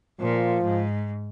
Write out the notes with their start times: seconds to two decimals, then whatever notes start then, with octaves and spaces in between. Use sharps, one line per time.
0.20 A#2 F3
0.64 G#2